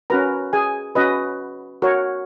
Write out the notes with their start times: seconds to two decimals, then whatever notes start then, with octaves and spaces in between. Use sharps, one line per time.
0.10 C#4 F#4 A#4 B4 A#5
0.53 G#4 G#5
0.95 C#4 F#4 B4 D#5
1.82 F#4 A#4 C#5